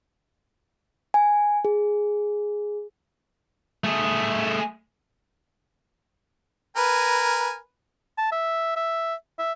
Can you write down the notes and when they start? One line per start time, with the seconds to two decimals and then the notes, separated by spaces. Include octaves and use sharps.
1.14 G#5
1.65 G#4
3.84 A3 G#4
6.76 A#4 B4 G#5
8.18 A5
8.32 E5
8.76 E5
9.39 E5